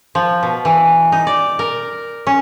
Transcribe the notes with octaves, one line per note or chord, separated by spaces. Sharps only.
F3
B2
E3
D#4
D5
A#4
C#4